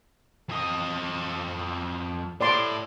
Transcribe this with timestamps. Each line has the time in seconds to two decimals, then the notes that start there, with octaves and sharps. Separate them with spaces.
0.49 F2 D#5
2.41 A2 D5 C6 D6